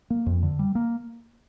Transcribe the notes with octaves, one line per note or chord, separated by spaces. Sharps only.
A#3
F2
D3
G3
A#3